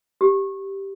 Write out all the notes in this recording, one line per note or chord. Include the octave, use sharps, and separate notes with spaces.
G4